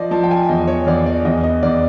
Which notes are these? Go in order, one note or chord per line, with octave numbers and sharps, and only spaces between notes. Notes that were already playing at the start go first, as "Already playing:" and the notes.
Already playing: F3 D5 D#5
F3 A5
G5
G#5
E2 D#5
C#5
E2 D5
D5
E2 D#5
D#5
E2 D5